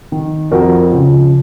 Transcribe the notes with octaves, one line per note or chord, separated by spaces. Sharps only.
D#3
F2 F#4 A#4
C#3 F3